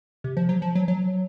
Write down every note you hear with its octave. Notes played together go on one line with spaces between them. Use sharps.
C3
F3
F#3
F3
F#3
F#3